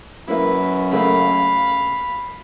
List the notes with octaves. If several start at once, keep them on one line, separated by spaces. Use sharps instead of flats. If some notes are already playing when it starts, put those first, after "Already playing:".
F#2 A#3 E4 B4
C#3 A3 A#3 F5 B5